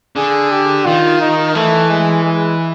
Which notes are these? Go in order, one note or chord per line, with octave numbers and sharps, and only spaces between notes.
D3 G#4
G4
D#3 F4
D#4
E3 A3
G#3
G#3